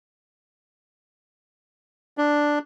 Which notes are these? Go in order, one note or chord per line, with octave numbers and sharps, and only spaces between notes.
D4